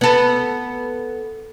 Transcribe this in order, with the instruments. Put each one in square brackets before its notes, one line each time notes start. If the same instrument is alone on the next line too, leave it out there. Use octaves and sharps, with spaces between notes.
[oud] B3 A4